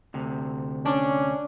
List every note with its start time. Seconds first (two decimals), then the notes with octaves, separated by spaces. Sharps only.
0.14 D2 C3
0.85 C#4 D4